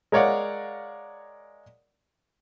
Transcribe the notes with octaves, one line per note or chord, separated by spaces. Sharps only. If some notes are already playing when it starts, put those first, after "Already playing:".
G#3 A#4 C#5 D5 F5 F#5